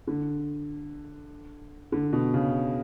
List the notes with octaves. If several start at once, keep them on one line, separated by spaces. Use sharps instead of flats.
D3
D3
B2
C#3